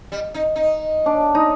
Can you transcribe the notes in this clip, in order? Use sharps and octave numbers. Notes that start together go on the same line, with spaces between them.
G3
D#4
D#4
D4
D#4